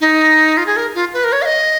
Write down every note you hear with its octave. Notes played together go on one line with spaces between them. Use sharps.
D#4
F4
G#4
A#4
F4
B4
A#4
C#5
F5
D#5